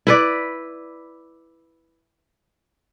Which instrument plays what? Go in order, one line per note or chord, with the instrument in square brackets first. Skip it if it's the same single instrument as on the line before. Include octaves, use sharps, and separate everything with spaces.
[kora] E4 B4 D5